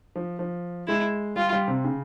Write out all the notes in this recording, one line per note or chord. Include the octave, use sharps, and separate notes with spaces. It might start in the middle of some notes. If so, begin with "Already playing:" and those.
F3
F3
G#3 E4
G3 F4
G3
C3
C#3